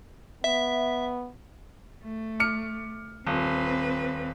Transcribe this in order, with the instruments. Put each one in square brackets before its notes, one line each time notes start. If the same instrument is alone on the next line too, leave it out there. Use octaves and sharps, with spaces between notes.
[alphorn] B3 [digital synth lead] E5
[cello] A3
[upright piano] D6 F6 C#7
[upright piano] D#1 [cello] C4 B4